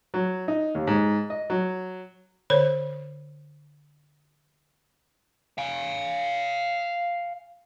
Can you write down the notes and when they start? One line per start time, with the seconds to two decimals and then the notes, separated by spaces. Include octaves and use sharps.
0.14 F#3
0.48 D#4
0.75 D#2
0.87 G#2
1.30 D#5
1.50 F#3
2.50 D3 C5 C#5
5.58 F5 G#5